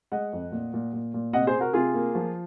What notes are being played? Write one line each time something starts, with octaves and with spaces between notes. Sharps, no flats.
G#3 D#5 F#5
F2
A#2
A#2
A#2
A#2
C3 D#5 F#5
G#4 C5
C3
F#4 A#4
C3 F4 G#4
A#3
F3